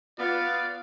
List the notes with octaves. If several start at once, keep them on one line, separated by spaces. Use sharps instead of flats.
B3 F4 D5 F5